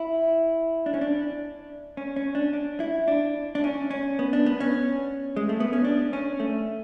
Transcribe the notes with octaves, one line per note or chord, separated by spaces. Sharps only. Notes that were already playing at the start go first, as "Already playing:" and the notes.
Already playing: E4
D4
C#4
D4
C#4
C#4
D4
D4
E4
D4
D4
C#4
C#4
B3
D4
B3
C#4
G#3
A3
B3
C#4
D4
C#4
A3